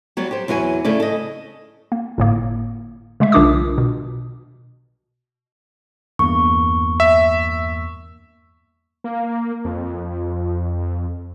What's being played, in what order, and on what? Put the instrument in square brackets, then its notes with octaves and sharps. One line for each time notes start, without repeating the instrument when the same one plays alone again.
[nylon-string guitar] F#3 G3 B3
G4 C5
E2 F#3 B4 D#5 G#5
C#3 A3 E4 D5
A4 D#5
[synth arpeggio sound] A#3
G1 A2 A#3
C#3 G#3 A3 E5
B1 D#3 D4 F4 D6 D#6
B2
[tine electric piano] E2 G2 A#3 [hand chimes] C#6
[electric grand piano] E5
[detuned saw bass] A#3
F2